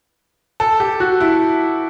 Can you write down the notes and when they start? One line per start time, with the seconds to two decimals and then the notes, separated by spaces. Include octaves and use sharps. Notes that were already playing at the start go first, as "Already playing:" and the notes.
0.60 A4
0.80 G4
1.00 F#4
1.20 E4